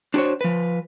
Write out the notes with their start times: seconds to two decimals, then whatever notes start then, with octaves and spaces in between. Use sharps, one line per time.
0.14 D4 F#4 G#4 C5 C#5
0.41 F3 B4